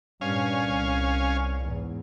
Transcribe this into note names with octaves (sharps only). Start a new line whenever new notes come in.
G2 A#2 C#4 F5 G#5
C2
E2 G#2